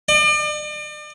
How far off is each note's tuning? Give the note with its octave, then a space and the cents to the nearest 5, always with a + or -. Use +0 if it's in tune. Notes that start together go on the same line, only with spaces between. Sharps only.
D5 +40